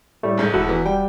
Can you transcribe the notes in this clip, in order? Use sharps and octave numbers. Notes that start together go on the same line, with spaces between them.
A2 G3 A3
F1 G#2 G6
E1 E4 F#4 A4
E2 E3
G3 G5